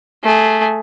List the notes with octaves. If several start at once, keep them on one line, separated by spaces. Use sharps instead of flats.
A3 G#4